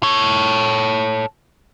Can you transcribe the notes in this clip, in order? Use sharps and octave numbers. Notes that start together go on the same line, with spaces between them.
A4 C#5